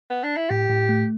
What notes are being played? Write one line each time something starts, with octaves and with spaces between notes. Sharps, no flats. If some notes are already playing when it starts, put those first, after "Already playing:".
B3
D4
E4
A2 G4
A2
A3